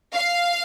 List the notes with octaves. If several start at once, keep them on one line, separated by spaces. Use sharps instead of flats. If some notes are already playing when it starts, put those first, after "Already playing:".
F5